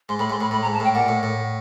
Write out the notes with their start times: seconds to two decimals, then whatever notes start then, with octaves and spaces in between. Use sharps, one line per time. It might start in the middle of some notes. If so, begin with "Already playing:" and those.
0.09 G#2 C6
0.19 A2 B5
0.30 G#2 C6
0.41 A2 B5
0.51 A2 B5
0.62 A#5
0.66 G#2
0.73 A5
0.80 A2 G5
0.94 A#2 F#5
1.08 A2
1.23 A2